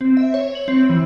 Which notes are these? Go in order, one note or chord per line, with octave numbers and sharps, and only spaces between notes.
C4
E5
C#5
F#7
C4
E3